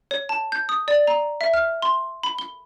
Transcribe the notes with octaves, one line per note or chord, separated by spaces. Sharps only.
C#5
A5
G6
D#6
D5
A#5
E5
F6
C6
B5
G7